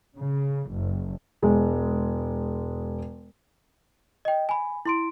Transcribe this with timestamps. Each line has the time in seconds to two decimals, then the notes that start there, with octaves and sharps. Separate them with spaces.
0.16 C#3
0.69 F#1
1.42 E1 G#3
4.25 D#5 G5
4.49 G#5 B5
4.86 E4 C6 D7